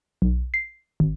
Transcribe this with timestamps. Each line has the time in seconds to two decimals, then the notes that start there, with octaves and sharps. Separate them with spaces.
0.22 B1
0.54 C7
1.00 G#1